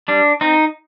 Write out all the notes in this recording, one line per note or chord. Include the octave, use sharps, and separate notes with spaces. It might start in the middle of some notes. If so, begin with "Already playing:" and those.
G3 D4
C4 D#4